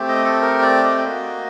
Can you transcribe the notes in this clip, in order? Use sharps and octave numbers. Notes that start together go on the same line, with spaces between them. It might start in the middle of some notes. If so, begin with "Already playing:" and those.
Already playing: A3 C4 G4
D#5
A4
A#4
D5
D#5
A#3 F#4